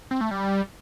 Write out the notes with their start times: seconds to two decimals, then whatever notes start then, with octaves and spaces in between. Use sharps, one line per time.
0.11 C4
0.21 A3
0.31 G3